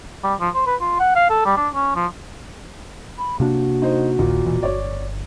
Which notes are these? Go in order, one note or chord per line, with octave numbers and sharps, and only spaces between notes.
G3
F3
C5
B4
F4
F#5
F5
A4
G3
D4
C#4
F3
B5
C3 A#3 D4 F#4
D#4 C5
D#1 A#1 D#2 A#2
E1 B2 E3
G1 C#5 D5